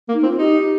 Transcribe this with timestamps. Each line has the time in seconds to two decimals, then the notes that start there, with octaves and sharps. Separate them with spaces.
0.09 A#3
0.13 D#4
0.23 C4
0.26 F4
0.39 D#4 G4